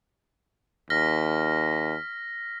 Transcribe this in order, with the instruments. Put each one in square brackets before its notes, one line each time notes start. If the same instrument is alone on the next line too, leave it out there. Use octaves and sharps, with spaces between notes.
[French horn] D#2 [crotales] F6 A#6 B6